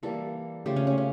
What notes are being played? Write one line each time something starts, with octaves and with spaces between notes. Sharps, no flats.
E3 G3 A#3 A4
C#3 F3 A3 G4
C#4
C#4
C#4